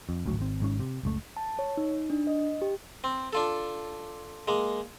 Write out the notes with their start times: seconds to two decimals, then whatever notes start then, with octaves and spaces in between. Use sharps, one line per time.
0.09 F2
0.25 G#1 D2 A2 F#3
0.39 G#1 C4
0.60 G#1 G#2 C#4
0.80 C3
1.03 F#1 C#2 A3
1.37 A5
1.59 C#5
1.77 D#4
2.10 D4
2.27 D#5
2.62 G4
3.04 C4
3.33 D4 F4 A4
4.48 G#3 A#3